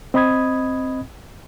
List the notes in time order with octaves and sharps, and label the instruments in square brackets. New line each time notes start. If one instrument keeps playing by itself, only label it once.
[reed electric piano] C4 D#5 B5 D#6 G#6